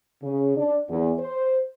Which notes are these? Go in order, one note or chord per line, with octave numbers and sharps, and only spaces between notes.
C#3
D4
E2
C5